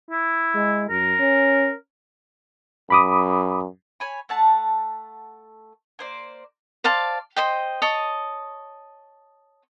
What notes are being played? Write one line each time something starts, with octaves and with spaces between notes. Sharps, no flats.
E4
G#3
F#2 A#4
C#4
F#2 B5 D6 D#6
C#5 G#5 B5
A3 F#5 A5
A#3 C5 D5
C5 D5 F5 A5
C5 D#5 G5
C#5 D#5 A5 D#6